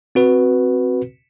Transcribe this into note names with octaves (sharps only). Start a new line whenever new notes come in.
C4 F#4 B4